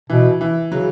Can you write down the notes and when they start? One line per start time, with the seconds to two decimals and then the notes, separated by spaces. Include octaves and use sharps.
0.10 B2 E3
0.41 E3
0.71 C#3 F#3